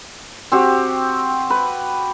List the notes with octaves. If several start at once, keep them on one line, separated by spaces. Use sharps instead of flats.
C4 F#4 G4
B4